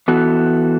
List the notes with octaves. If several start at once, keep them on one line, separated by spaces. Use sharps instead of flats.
E3 B3 F#4 A4